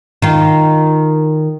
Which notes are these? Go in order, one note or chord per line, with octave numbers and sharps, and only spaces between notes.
D#3 F4